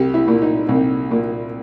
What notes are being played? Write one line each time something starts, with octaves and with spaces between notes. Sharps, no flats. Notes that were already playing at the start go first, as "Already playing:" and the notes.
Already playing: C2 G4
E4
A#2
D#4
C2
A#2